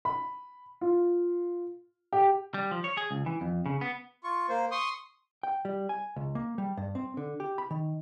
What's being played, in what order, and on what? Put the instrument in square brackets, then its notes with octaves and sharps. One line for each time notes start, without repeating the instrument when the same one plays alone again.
[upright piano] B5
F4
G4
[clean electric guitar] G3
F3
C#5
G#4
C#2
E3
F2
C#3
B3
[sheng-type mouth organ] F4 C#6
A#3 C5
C6 C#6 D#6
[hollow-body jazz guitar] G5
G3
G#5
C#2
A#3
G3
G2
C4
D3
G4
B5
D#3